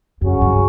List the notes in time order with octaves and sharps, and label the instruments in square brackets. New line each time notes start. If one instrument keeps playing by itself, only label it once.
[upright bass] F#2 [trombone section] C#3 F#3 C#4 F#4
[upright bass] G2